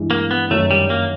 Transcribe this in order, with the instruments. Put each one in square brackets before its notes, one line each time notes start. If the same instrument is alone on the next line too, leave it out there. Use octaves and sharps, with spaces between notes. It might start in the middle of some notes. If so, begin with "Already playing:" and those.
Already playing: [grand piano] G2 E3 G#3
[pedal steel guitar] A#3
B3
[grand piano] F#2 D#3 F#3 [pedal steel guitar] A3
[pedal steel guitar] G3
A#3